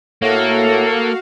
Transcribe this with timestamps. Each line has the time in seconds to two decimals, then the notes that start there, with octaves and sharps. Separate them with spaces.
0.22 A2 A#3 F#4 A4 F5